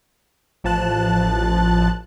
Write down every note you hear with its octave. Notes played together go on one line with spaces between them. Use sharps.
A1 F3 A5 F#6